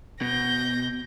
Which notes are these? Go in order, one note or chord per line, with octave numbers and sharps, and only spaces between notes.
B2 G6 A#6